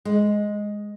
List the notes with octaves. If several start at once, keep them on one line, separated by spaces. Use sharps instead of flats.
G#3